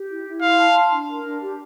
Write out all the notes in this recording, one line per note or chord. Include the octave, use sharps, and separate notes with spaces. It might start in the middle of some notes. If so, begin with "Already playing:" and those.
Already playing: G4
E4
E4
F5 C6
A5
C6
D4
A#4
D4
G4